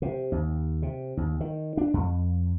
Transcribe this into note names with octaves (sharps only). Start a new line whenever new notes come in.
C3
D#2
C3
D#2
D#3
D4
F2